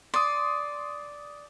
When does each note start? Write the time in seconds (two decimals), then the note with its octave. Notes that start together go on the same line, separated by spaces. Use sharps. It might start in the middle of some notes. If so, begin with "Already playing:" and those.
0.14 D5 C6 D#6